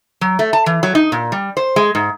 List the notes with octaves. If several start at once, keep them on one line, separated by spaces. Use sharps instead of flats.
F#3
A3
A5
E3
F#3
D#4
A#2
G3
C5
G#3
G#2